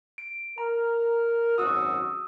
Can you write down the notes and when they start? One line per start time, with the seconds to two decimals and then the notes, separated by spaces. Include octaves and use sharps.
0.18 D7
0.58 A#4 A#5
1.58 G#1 F#2 F#4 D#6 E6